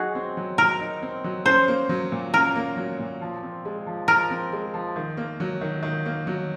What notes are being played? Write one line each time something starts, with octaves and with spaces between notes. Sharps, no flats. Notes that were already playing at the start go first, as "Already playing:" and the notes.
Already playing: F#3 D#4 F#4 G#4
C4
F#3
F#3 A#4
D#4
C4
F#3
C#4 C5
A#3
F#3
A#2
C#4 A#4
A#3
F#3
A#2
F3
C4
G#3
F3
F3 A#4
C4
G#3
F3
D#3
A#3
F#3
D#3
D#3
A#3
F#3